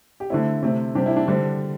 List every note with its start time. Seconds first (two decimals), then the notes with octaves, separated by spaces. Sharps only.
0.20 G4
0.30 D3 A3 C4 E4
0.62 C3 A3 C4
0.95 C3 G3 C4 D4 G4
1.06 E4
1.16 D4
1.28 D3 G3 C4 D4